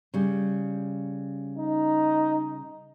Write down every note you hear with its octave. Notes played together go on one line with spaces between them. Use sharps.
C#3 G3
D#4